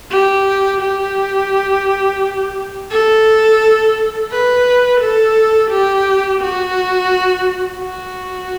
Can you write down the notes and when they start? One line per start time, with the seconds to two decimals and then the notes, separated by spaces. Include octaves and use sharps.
0.11 G4
0.81 G4
2.91 A4
4.31 B4
5.01 A4
5.71 G4
6.41 F#4
7.80 F#4